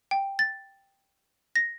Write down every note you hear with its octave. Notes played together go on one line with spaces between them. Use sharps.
G5
A6
A#6